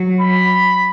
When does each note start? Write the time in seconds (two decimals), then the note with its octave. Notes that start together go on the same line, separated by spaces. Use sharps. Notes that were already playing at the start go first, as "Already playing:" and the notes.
Already playing: F#3
0.21 B5